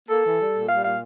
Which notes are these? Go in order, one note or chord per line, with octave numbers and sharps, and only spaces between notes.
A#3 A4
E3
G3
A#2
G3 F5
A#2 F5